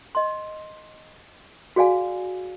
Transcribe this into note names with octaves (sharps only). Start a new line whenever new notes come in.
D#5 C6
F#4 G#4 D5 F5 G#5